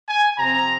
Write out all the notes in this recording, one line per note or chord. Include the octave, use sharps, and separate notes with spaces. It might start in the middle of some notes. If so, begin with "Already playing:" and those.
G#5
C3 F3 C4 A#5